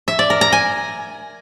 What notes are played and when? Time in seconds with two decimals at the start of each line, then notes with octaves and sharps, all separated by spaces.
0.08 E5
0.19 D5
0.30 A#4
0.41 A#5
0.52 G#5